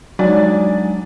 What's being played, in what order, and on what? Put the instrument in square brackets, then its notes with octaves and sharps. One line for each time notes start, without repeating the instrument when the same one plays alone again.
[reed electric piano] F#3 D4 [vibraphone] G#3 D#4 [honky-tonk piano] D5 G#5